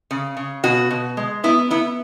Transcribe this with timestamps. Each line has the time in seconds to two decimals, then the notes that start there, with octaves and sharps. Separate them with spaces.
0.11 C#3
0.37 C#3
0.63 B2 F#4
0.91 B2
1.17 G#3
1.44 B3 E4
1.71 B3 E4